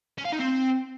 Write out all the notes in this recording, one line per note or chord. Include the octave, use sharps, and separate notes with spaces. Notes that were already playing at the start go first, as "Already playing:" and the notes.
C#4
F5
D#4
C4